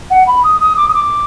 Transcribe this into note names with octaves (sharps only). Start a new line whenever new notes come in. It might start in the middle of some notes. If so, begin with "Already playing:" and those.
F#5
B5
D#6
D#6
D6
D#6
D6